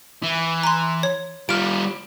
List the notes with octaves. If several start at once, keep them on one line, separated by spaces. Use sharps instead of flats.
E3
A#5 C6
C#5
G3 F4 F6 D7